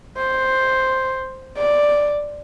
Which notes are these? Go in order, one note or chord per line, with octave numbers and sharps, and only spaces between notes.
C5
D5